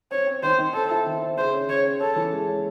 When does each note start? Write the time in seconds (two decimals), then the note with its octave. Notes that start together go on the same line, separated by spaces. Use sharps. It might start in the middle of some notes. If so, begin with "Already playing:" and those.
0.11 C4 C#5
0.27 C4
0.43 D#3 C5
0.59 D#3
0.74 C4 A4
0.91 E4
1.06 D#3
1.22 C4
1.37 C#3 C5
1.53 C#4
1.69 C#3 C#5
1.85 C#4
2.00 C#4 A4
2.16 E3
2.32 G#3
2.49 C#4